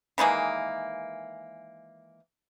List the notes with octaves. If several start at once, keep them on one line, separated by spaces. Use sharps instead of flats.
D#3 E3 G#3 A#3